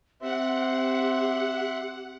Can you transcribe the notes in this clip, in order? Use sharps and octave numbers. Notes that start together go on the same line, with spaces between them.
C4 G4 E5 F#5 C6